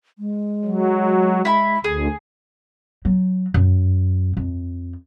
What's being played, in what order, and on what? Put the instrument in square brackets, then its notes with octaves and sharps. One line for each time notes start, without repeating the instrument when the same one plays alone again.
[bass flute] G#3
[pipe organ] F#3
[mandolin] E4 B5
[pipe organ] D2 [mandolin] G#4
[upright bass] F#3
F#2
F2